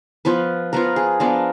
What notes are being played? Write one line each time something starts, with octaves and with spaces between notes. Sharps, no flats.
F3 B3 F4 B4
F3 B3 F4 A#4
G#4
F3 B3 D4 F4 A#4